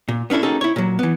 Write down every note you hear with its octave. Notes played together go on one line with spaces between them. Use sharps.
A#2
B3 C#4 D4 E4 A4
A#3 C#4 D#4 F#4 G#4 A4
E4 C#5
A#2 F#3
E3 B3